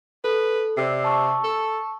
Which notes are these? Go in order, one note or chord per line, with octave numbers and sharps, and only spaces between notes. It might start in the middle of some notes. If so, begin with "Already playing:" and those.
A4 B4
C3 D5 E6 C7
A5 C#6 E6
A4